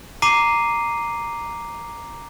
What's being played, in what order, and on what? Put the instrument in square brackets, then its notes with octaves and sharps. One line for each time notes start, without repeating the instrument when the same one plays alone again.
[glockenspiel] A#5 D6 C7 D#7